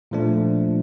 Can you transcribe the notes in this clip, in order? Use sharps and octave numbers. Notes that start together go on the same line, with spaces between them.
A#2 F3 A3 D4